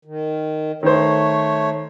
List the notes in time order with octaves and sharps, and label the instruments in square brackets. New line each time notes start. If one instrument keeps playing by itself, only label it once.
[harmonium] D#3
[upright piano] D#3 C5 [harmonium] A3 C#5